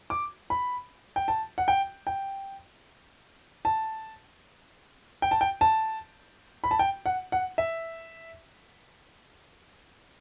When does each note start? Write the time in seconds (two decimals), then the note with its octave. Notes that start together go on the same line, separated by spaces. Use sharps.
0.10 D6
0.50 B5
1.16 G5
1.28 A5
1.58 F#5
1.68 G5
2.07 G5
3.65 A5
5.22 G5
5.31 A5
5.41 G5
5.61 A5
6.64 B5
6.71 A5
6.79 G5
7.06 F#5
7.32 F#5
7.58 E5